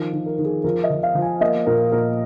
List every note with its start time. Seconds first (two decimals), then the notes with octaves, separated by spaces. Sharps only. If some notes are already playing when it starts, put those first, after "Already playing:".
Already playing: D#3 F3 A#4
0.13 D#3
0.26 A#4
0.38 D#3
0.45 G#4
0.64 F3 A#4
0.84 D#5
0.90 F3
1.03 F5
1.15 F3
1.22 G#5
1.41 A#3 D#5
1.66 A#2 A#4
1.92 A#2 A#4